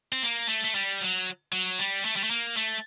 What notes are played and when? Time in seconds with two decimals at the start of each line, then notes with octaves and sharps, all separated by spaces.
0.13 C4
0.22 A#3
0.49 A3
0.64 A3
0.75 G3
1.01 F#3
1.53 F#3
1.79 G3
2.05 A3
2.16 G3
2.24 A3
2.31 A#3
2.57 A3